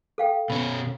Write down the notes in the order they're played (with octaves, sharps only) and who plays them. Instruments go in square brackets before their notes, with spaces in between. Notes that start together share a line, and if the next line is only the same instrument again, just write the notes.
[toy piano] A4 F5 G5
[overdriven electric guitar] B2 C#4 [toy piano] B5